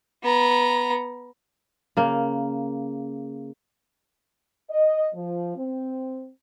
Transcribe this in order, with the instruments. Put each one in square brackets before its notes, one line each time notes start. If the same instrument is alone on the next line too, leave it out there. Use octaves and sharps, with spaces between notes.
[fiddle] B3 A#5
[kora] C#3 A#3
[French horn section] D#5
F3
C4